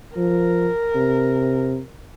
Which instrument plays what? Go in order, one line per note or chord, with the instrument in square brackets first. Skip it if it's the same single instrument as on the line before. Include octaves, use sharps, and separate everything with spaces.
[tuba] F3 [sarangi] A#4
[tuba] C3